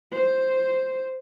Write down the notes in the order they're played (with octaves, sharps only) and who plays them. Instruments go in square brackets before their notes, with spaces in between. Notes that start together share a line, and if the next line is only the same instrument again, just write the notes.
[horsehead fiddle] C5